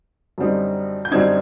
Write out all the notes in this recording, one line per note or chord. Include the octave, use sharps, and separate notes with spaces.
F#2 D3 G3 C4 D#4
G6
F#2 D3 G3 C4 D#4 G#6